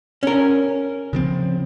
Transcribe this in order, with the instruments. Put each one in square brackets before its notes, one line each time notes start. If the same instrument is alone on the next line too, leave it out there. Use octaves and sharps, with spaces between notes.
[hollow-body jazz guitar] C#4 A#4
[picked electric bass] C#3 F3 C4